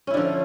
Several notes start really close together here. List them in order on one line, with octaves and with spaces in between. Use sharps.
C#4 E4 D3 F3